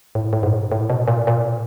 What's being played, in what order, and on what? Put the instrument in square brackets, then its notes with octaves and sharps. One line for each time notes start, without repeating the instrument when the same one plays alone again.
[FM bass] A2
A2
G#2
A2
B2
A#2
A#2